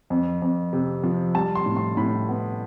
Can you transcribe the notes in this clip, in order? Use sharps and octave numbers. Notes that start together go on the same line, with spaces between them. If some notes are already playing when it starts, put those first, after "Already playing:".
F2
F2
C3
F3
G3 A5
C6
A2
C6
A2 B5
B3